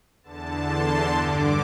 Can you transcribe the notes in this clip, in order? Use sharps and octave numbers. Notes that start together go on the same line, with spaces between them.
E2 D3 A5
C6
G2 D3 D6